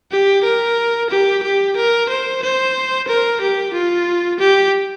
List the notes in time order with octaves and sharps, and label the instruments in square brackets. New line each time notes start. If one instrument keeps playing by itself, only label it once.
[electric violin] G4
A#4
G4
G4
A#4
C5
C5
A#4
G4
F4
G4